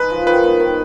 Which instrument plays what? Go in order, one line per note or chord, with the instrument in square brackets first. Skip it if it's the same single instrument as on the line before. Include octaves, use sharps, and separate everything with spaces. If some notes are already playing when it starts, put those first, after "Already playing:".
Already playing: [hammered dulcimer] G#3 D#4 [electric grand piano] B4
[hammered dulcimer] F3
[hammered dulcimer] D#3 [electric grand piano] B4
[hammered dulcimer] B3
D#3